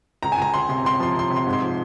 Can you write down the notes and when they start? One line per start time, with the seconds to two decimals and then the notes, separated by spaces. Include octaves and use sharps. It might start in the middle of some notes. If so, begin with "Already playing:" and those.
0.22 C#2 A#5
0.32 G#5
0.38 C#2 A#5
0.53 C#2 C6
0.69 C3 C6
0.84 C#2 C6
1.00 F3 C6
1.15 C3 C6
1.30 C3
1.36 C6
1.46 G#2
1.53 C6
1.62 F3